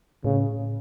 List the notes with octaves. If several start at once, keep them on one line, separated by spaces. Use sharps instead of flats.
A2 C#3